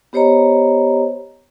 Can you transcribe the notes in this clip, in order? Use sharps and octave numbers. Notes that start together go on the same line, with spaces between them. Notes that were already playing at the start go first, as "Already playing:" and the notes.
B3 G4 C5 C#5 D#5 A#5